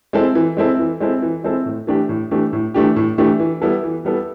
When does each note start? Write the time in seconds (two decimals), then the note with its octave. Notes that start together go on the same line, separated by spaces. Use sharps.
0.13 G#3 C4 E4 A4
0.35 E3
0.57 G#3 C4 E4 A4
0.79 E3
1.00 G#3 C4 E4 A4
1.22 E3
1.44 G#3 C4 E4 A4
1.66 A2
1.87 E3 A3 D4 G4
2.09 A2
2.31 E3 A3 D4 G4
2.53 A2
2.74 E3 A3 D4 G4
2.96 A2
3.18 E3 A3 D4 G4
3.40 E3
3.62 G3 B3 E4 A4
3.83 E3
4.05 G3 B3 E4 A4